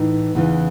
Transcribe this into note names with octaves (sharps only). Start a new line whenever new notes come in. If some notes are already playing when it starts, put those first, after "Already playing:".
Already playing: A2 E3 D#4
E2 C#3 E3